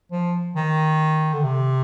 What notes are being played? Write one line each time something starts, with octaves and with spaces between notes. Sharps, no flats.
F3
D#3
D3
C3